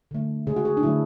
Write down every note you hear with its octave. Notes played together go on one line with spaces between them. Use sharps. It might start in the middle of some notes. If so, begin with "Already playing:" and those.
D3 A3
C#3 G#3 G#4
F#4
G#4
D4
D3 F#3 A3 E4